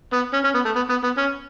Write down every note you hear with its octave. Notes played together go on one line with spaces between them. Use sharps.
B3
C#4
C#4
B3
A3
B3
B3
B3
C#4